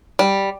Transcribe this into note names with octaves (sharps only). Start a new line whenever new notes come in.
G3